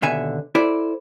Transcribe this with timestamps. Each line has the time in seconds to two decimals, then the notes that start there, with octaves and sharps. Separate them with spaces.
0.02 D#2 B2 D3 E5 G#5
0.55 E4 A4 C5 D5